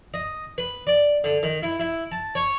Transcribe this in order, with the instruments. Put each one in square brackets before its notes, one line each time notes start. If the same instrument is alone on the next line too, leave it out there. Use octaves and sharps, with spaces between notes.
[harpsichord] D#5
B4
D5
D3
D#3
E4
E4
A5
C#5